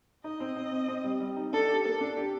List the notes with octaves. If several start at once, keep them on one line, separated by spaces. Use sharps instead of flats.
D#4 D#5
C4
C4
C4
C4
G3
G3
D#4
D4 A4
G4
A#3 A4
D4
G4